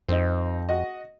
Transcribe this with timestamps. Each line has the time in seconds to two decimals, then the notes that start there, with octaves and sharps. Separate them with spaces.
0.08 F2 C4 D#4
0.69 F#4 D#5